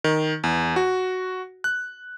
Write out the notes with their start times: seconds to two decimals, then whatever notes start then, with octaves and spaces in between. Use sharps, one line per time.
0.04 D#3
0.44 E2
0.76 F#4
1.64 F#6